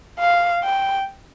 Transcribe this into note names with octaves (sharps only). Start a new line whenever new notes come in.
F5
G5